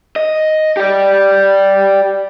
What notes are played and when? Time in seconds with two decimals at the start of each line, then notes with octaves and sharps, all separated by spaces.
0.16 D#5
0.77 G4 D5